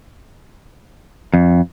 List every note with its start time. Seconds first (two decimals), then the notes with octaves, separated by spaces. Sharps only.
1.34 F2